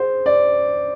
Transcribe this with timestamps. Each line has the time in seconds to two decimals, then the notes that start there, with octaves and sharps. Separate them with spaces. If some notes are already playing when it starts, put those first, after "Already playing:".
Already playing: G#4 C5
0.26 D5